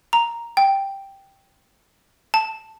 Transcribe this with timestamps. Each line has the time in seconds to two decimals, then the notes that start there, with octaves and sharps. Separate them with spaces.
0.13 A#5
0.57 G5
2.34 A5